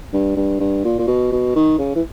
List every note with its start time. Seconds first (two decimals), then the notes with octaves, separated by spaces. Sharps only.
0.13 G2
0.37 G2
0.60 G2
0.84 A#2
0.99 A#2
1.07 B2
1.32 B2
1.55 D#3
1.78 C#3
1.96 E3